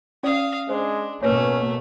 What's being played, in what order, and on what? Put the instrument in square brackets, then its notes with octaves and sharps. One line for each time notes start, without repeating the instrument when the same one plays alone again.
[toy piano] C#4 D5 [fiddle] F5 D#6
[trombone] G#3 [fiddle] D4 [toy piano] C5
[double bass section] B2 A#3 [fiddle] A3 [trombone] C#4 [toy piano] B4 C#5